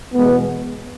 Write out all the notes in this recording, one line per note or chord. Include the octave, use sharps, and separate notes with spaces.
E2 B2 G#3 B3